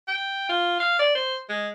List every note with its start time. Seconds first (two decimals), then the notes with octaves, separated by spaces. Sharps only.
0.08 G5
0.49 F4
0.80 F5
0.99 D5
1.15 C5
1.49 G#3